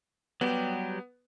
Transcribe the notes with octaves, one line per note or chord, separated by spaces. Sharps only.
F#3 G3 B3 G4